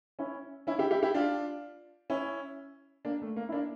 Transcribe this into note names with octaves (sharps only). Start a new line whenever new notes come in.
C#4 E4
C#4 E4
E4 G4
E4 G4
E4 G4
D4 F4
C#4 E4
A#3 D4
A3
A#3
E4
A#3 D4